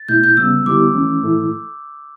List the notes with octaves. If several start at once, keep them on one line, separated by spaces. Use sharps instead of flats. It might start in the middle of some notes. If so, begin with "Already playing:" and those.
Already playing: A6
B2 A3 E4 G6
G6
C#3 G3 B3 E6
D3 G3 B3 E4 G4 D6
E3 A3 C#4
A2 E3 A3 E4 A4